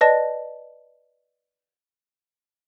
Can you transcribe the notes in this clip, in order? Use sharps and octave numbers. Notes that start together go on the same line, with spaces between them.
B4 D5 D#5 A5 A#6